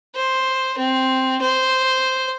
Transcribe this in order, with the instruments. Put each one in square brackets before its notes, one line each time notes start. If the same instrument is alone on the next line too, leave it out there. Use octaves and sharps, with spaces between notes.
[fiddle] C5
C4
C5